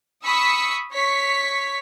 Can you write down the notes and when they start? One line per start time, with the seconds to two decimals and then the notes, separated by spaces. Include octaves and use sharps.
0.24 B5 C#6 D#6 E6 B6 C#7
0.91 C#5 C#6 B6